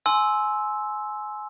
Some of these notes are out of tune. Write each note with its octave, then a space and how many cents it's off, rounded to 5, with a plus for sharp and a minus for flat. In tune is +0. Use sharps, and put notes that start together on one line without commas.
G#5 +25 C6 +0 E6 -10